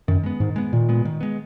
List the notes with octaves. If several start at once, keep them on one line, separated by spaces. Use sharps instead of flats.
F#2 D#3
G#3 B3
G#2 D#3
G#3 B3
A#2 D#3
G#3 B3
D#3
G#3 B3